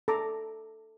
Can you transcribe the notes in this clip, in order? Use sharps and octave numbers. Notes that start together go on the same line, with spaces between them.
A4 A#5 D6